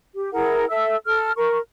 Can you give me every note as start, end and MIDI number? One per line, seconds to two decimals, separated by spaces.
0.15 0.32 67
0.33 0.65 64
0.33 0.65 68
0.33 0.65 70
0.33 0.65 78
0.69 0.95 69
0.69 0.95 76
0.69 0.95 88
1.06 1.31 69
1.06 1.31 89
1.37 1.59 70
1.37 1.59 85